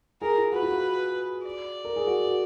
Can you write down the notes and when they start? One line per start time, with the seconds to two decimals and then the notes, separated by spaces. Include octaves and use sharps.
0.22 G#4 A#4
0.37 F4
0.52 F#4 B4
0.62 F4
0.68 F#4
1.45 D5
1.85 A#4
1.96 G#4
2.07 F#4
2.27 F#4